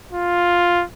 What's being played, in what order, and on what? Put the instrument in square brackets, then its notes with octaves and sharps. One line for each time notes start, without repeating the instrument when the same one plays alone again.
[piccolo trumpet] F4